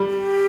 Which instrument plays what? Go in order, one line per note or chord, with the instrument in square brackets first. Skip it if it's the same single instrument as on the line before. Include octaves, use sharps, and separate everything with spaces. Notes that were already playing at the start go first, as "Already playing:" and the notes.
Already playing: [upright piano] G3
[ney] G4